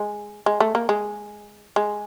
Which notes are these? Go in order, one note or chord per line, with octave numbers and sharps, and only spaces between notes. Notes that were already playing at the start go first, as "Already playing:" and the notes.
Already playing: G#3
G#3
A3
A#3
G#3
G#3